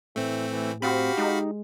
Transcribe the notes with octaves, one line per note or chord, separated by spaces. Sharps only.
A2 E3 A3 C4
E3
C4 F#4 G4 F5 B5
G#3 D#4